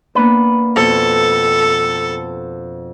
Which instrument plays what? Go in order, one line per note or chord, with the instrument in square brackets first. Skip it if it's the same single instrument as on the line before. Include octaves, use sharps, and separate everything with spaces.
[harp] A#3 B3 D4 [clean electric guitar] B4
[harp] F2 B2 [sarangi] A4